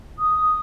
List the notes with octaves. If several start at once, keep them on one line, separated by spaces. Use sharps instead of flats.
D#6